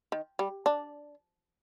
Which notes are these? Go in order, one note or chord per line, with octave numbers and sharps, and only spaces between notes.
D#3
G3
D4